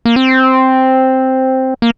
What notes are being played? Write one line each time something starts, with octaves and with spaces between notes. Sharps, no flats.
A#3
C4
A#3